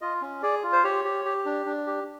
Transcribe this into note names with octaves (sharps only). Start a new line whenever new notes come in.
F4 D#5
C#4
G#4 D5
F4
C5
G4 C#5
G4
G4
D4
D4
G4